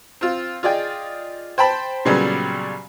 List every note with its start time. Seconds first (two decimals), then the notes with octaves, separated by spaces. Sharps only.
0.21 C4 F4
0.63 F4 G#4 D5 D#5 G5
1.58 C5 G5 A5 B5
2.05 A#2 C#3 F#3 G3 B3 C#4